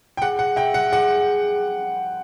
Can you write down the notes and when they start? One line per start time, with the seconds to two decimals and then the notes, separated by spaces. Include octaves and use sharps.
0.17 G5
0.22 G#4 F#5
0.39 F#5
0.56 E5 G5
0.74 F#5
0.92 G#4 F#5